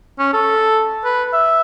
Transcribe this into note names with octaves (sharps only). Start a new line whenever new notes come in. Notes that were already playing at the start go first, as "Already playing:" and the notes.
C#4
A4
B4
E5